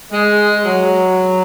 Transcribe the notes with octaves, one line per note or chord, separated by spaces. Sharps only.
G#3
F#3